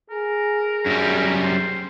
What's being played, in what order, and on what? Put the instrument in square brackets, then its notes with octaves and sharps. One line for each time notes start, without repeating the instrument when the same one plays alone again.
[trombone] G#4 [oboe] A#4
[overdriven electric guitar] F#2 G3
[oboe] C5